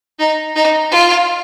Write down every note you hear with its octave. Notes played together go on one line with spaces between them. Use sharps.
D#4
D#4
F4